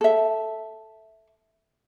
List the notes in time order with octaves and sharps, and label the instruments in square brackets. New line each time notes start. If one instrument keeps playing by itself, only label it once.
[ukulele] A4 E5